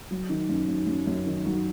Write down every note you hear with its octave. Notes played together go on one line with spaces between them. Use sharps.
F#3
D#3
F#2
F#2
F#2
F#2
D#3
F#3